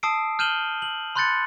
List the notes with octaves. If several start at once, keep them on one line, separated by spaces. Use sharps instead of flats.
A5 D#6 E6 C7 D7
F6 G6 D#7 E7 F#7 G7
F#7
B5 C6 F#6 G6 A6 C#7